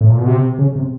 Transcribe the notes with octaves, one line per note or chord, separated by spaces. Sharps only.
A2
A#2
B2
C3
C#3
C3